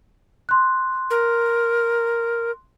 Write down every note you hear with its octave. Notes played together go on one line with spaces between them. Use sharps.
C6 F#6
A#4